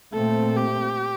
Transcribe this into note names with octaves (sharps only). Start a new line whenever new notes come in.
A#2 A3 C4 A4
G4